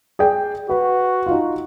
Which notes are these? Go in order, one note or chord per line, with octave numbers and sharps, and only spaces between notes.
G#4 D5 G5
F#4 B4
D#4 F4